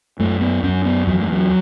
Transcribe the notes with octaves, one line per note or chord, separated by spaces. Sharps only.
F#2 A3
B3
F#2 C#4
B3
E2 F#3
A3
F#3